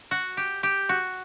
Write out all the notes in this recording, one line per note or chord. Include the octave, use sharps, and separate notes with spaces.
F#4
G4
G4
F#4